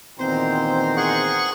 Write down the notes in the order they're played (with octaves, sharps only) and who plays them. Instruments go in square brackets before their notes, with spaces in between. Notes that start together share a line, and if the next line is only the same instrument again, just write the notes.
[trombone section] E2 A#2 D#3 [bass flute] C4 [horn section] C5 G5 A#5
[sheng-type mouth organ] G#4 F#5 C#6